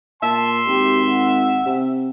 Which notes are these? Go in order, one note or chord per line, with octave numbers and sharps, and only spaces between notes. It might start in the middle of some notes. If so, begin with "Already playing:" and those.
A#2 E5 A5 C6
G#1 G4
F#5
C3